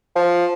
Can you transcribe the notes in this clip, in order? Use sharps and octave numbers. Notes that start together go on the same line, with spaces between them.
F3